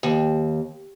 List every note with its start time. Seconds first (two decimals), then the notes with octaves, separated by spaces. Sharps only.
0.03 D#2